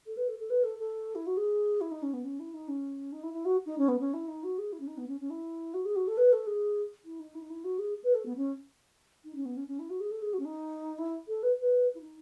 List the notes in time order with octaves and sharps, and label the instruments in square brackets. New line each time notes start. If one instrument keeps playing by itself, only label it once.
[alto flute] A4
B4
A4
A4
B4
A4
A4
E4
F#4
G#4
E4
D#4
C#4
B3
C#4
E4
D#4
C#4
D#4
E4
E4
F#4
D#4
C#4
B3
C#4
E4
D#4
F#4
G#4
E4
C#4
D#4
B3
C#4
C#4
E4
F#4
G#4
F#4
A4
B4
A4
G#4
E4
D#4
E4
D#4
E4
F#4
G#4
B4
A4
B3
C#4
D#4
C#4
B3
C#4
C#4
E4
F#4
G#4
A4
G#4
F#4
C#4
D#4
E4
A4
B4
B4
E4
D#4